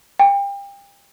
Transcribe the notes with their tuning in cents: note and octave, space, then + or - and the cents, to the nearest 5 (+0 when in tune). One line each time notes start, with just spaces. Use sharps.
G5 +30